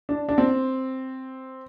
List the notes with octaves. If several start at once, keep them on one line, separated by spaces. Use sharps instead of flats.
D4
D4
C4